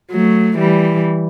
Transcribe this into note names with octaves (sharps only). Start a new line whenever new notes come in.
F#3 A3
E3 G3